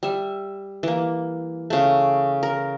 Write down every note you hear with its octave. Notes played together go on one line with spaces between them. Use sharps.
G3 E5
E3 A#3
C#3 A3
A#4